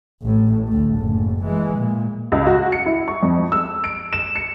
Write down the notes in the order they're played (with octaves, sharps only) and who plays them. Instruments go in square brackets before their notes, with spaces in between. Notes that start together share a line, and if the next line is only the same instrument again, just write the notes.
[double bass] A1 A2
D2 A3
F#1 A2
E3 G#3
A#2
[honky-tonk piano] C#2
F#4
C#7
E4
C#6
F2
E6
D7
E7
C#7